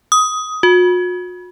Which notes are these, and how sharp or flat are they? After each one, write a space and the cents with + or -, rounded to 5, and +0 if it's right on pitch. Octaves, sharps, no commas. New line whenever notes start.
D#6 +15
F#4 -45